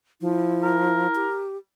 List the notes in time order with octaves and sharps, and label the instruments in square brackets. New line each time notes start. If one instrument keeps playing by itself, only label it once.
[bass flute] F3 [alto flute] E4
[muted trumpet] A#4
[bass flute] G4